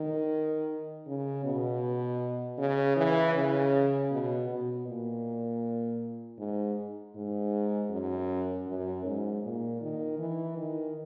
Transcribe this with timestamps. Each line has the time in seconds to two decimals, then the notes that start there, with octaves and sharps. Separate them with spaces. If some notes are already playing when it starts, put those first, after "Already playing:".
Already playing: D#3
1.07 C#3
1.45 B2
2.58 C#3
2.96 E3
3.34 C#3
4.11 B2
4.49 B2
4.87 A#2
6.38 G#2
7.15 G#2
7.90 F#2
8.67 F#2
9.05 G#2
9.43 A#2
9.81 D#3
10.18 E3
10.57 D#3